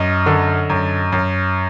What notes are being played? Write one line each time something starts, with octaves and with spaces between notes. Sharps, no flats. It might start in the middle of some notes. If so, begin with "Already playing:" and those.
Already playing: F#2 D#5
D3
F#2
F#2